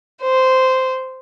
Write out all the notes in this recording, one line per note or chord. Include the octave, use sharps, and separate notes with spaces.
C5